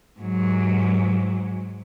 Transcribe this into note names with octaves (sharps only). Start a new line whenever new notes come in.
G#2 F#3